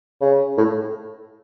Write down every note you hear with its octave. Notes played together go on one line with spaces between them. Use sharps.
C#3
A2